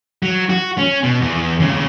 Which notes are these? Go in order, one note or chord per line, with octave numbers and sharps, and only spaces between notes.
F#3
F#4
C#4
B2
E2
D#2 C#3